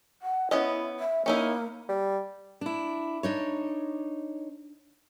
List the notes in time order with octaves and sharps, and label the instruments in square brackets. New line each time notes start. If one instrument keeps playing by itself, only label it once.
[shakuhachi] F#5
[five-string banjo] B3 C#4 D#5 [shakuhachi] E4
[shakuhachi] E5
[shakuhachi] A#3 [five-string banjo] C#4 D#4 E4
[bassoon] G3
[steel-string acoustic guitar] D4 E4
D4 D#4 C#5